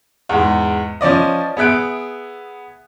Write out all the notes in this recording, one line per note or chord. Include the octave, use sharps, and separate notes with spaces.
E2 G#2
F3 C#4 D5 D#5
B3 G#4 E5 F#6 D7